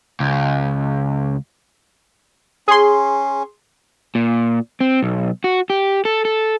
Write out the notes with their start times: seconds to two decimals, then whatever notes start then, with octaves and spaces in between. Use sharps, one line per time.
0.20 C#2
2.68 C#4 G#4 C6
4.15 A#2
4.81 C4
5.03 B1
5.44 F#4
5.70 G4
6.05 A4
6.25 A4